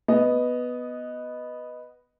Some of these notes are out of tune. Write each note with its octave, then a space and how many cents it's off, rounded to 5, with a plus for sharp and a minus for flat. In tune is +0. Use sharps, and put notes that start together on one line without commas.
B3 +0 D#5 +0